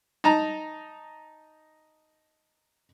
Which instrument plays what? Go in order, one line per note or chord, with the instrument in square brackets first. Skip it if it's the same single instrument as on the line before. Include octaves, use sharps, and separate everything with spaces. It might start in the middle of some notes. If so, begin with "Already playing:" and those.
[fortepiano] D#4 A5 A#5